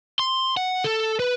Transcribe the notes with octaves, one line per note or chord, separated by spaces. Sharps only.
C6
F#5
A4
B4